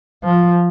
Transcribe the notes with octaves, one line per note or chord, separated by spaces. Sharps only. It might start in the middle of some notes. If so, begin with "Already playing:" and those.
F3